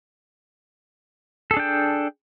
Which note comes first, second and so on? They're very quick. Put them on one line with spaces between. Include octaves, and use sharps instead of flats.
A4 G#4 D4 G5